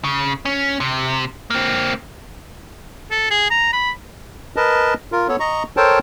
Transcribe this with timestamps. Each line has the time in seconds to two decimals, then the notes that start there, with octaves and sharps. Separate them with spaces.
0.04 C#3
0.45 C#4
0.80 C3
1.50 A#3 C4
3.11 A4
3.31 G#4
3.50 A#5
3.73 B5
4.56 A#4 B4 D#5 A5
5.12 F4 A#4
5.28 B3 A4 C#5
5.40 D#5 A#5 C#6
5.77 A4 A#4 C5 C#5 G5 A5